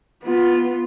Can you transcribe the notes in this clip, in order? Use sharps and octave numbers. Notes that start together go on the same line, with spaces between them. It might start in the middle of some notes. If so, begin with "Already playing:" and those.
B3 F4